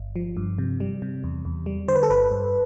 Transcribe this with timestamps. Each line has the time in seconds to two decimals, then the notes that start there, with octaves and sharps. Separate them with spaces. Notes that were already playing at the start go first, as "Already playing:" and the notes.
Already playing: G1
0.16 F3
0.37 G2
0.58 C3
0.80 G3
1.02 C3
1.24 E2
1.45 E2
1.66 G3
1.88 D3 C5
1.96 B4
2.03 A4
2.10 G1 B4
2.31 G2